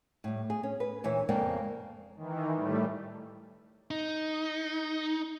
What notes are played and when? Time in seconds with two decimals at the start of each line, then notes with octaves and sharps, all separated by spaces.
0.24 A2 G3
0.50 G#4
0.63 C#4
0.80 B4
1.03 D2 A#2 E3 C#5 E5
1.29 F2 C#3 G#3 A#3 D5 G5
2.17 D#3 E3
2.55 A2 G3 A3
3.91 D#4